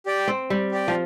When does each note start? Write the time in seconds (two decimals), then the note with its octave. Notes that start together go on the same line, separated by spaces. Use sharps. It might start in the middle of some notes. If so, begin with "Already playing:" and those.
0.06 G4 D5 G5
0.28 C4
0.50 G3
0.71 G4 D5 G5
0.88 F3